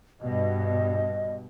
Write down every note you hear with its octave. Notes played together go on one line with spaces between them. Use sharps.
G2 B2 D#5